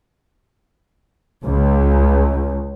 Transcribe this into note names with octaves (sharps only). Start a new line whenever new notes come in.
C#2